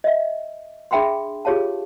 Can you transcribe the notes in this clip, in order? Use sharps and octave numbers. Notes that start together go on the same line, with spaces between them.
D#5 E5
D4 G#4 E5 G5 B5 C6
F4 G4 G#4 C#5 F5 A5